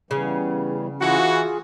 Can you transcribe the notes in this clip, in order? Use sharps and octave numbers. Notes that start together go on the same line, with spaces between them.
C#3 E3 G3 B3
E3 F4 F#4 G#4